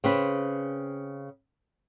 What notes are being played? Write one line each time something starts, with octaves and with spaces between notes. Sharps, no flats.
C#3 C4 B4